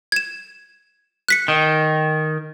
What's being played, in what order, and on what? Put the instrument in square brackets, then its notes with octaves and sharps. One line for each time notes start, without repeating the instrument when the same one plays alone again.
[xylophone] G#6 E7
F#6 B6 C#7
[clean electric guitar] D#3